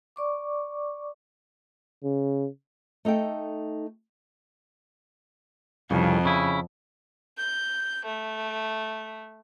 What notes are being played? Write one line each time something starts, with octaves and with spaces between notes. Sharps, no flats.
D5 C#6 D6
C#3
A3 D#4 A4 G5
C2 F2 C#3
C#3 E4
G6
A3